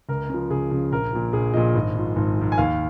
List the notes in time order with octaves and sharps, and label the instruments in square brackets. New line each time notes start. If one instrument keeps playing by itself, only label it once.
[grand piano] C#2 A#4
C#3 F3
C#2 G#4
C#3 F3
A#1 A#4
A#2 F3
A#1 G#4
A#2 F3 D#5
G#1
G#2 F3
G#1
G#2 F3
G#5
D#2 F5